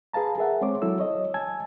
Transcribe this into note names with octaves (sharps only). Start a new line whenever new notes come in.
G#4 B4 F5 A5 A#5
G#4 A#4 E5 F#5
G#3 C4 C5 C#5 D6
F#3 E4 F#4 A4 E6
C#5 D#5
G#5 A5 E6 G#6